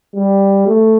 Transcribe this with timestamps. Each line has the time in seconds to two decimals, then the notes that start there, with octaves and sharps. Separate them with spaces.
0.15 G3
0.68 A3